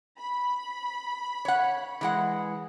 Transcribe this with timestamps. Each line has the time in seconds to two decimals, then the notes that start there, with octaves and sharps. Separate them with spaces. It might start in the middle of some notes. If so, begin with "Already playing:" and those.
0.19 B5
1.45 C#5 F#5
2.01 E3 G#3 F#5